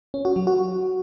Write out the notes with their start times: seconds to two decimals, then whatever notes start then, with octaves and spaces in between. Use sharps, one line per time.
0.14 C#4
0.25 F#4
0.36 F#3
0.47 F#4